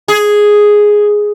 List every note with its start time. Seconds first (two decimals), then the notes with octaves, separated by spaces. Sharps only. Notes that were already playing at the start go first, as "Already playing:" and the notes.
0.08 G#4